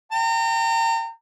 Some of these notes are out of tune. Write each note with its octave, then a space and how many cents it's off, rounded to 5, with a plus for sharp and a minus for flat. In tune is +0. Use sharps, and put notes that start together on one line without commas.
G5 +0 A#5 -35